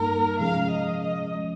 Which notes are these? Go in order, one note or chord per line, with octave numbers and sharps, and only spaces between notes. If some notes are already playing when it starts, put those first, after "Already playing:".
Already playing: G2 G3 A#3 D#4 A#4
C3 F3 G#3 C#4 G#4 F5
D#5
D#5
F3 G#3 C#4